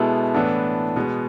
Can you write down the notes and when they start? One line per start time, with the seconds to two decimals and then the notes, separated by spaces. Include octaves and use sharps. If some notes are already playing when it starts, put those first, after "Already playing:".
Already playing: B2 G#3 B3 E4 A4
0.34 A2 E3 B3 D4 A4
0.96 B2 G#3 B3